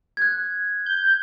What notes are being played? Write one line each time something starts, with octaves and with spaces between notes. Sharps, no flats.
F#6 G#6
G6